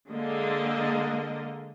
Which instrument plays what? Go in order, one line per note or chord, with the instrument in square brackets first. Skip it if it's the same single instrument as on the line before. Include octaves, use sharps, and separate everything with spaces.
[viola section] D3 G#3 A#3 D#5